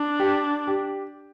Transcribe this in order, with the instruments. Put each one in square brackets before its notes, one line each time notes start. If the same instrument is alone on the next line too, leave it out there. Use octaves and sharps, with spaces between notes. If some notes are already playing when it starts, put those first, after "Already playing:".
Already playing: [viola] D4
[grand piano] G4
G4